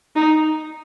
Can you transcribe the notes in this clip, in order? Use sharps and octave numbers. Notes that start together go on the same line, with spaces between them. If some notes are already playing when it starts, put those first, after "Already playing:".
D#4